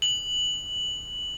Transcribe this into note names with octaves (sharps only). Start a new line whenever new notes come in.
F#7